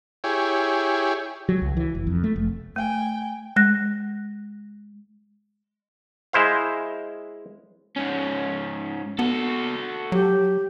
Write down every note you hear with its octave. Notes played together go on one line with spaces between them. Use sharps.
E4 G4 G#4 C#5
F#3
C#2
E3
F1
F2
A3
F1
A3 G5 G#5
G#3 F#6 A#6
G#3 E4 C5 F5
G#2 C#4
B3 F#4 A4
F#3 G4